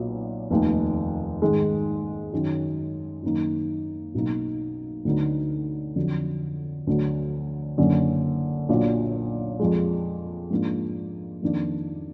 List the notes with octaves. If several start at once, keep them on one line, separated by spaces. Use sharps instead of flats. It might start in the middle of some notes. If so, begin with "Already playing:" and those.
Already playing: B1 A#2 F#3 B3
F1 D#2 D#3
G#2 D#3 G#3
F#2 D#3 F#3
F#2 D#3 A#3 D#4
B1 B2 A#3 D#4
D2 D3 F#3 B3 D#4
F2 D3 F#3
D2 D3 F#3
F#1 F#2 D3
B1 A#2 F#3 D4
F2 F3 G#3
G#2 F3 A#3 D4
F2 D#3 A#3 D4